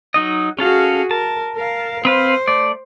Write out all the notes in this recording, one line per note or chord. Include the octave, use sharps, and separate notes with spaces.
F#3 D#4 D#5
C#4 F#4 G#4 A4 F5
A#4 A5
A#4 F5
C4 B4 C5 F5
A3 D5